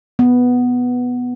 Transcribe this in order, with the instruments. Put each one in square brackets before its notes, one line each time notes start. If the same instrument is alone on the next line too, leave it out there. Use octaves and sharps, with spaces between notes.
[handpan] B3